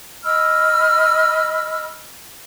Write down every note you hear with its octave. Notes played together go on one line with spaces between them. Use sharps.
D#5 B5 E6 F6